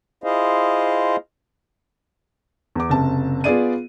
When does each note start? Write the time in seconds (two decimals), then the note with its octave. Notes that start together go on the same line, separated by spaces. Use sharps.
0.24 E4 F4 G#4 C5 D#5 F5
2.75 E2 D6
2.90 F#1 C3 A5
3.44 B3 F4 G#4 D5 D#7